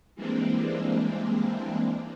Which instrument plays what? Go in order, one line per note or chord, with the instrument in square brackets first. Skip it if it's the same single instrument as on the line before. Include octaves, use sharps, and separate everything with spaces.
[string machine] E3 G3 G#3 A#3 C4 D4